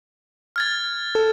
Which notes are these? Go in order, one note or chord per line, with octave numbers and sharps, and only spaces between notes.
F6 G#6 A6
A4